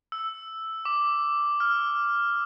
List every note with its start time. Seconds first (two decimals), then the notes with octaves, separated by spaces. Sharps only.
0.12 E6
0.85 D6
1.60 F6